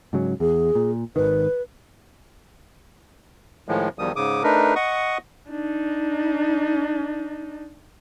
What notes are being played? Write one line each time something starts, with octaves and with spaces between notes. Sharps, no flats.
G#2 C#3 F#3
E2 G#4
A#2
G#1 D#3 B4
A2 D#3 F3 G#3
E2 D#3 F3 G3 D#6
G#2 C#3 D6 D#6
A3 D4 D#4 A#4 B4
D#5 F#5 C#6 D#6
D4 D#4